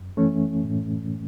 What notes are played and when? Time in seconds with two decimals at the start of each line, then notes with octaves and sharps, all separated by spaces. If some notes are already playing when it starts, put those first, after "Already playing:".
Already playing: F#2
0.17 E3 A3 C#4
0.64 A2